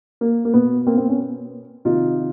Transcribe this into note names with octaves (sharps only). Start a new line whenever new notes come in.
A#3
A#3
B2 B3
A#3 C4
A#3 C4
B3 C#4
C3 D#3 D#4 F4